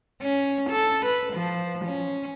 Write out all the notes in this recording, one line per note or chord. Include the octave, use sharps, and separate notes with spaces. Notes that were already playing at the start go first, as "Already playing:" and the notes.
C#4
A4
B4
F3
C#4